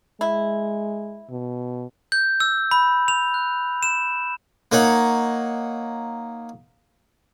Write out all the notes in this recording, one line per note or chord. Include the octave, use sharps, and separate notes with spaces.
G#3 E4
B2
G6
E6
B5
F7
F#6
E7
A#3 D#4 C#5 F#5